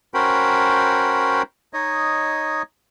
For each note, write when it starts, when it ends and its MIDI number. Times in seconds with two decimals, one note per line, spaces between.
0.14 1.43 61
0.14 1.43 66
0.14 1.43 70
0.14 1.43 72
0.14 1.43 79
0.14 1.43 83
1.73 2.62 63
1.73 2.62 73
1.73 2.62 75